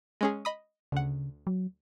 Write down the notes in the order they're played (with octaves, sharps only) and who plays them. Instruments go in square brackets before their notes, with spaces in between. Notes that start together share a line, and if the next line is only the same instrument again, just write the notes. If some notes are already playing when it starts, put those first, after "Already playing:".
[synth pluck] G#3 C#4 G#4
D#5 B5 D#6
[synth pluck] D2 F#5 [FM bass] C#3
[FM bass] F#3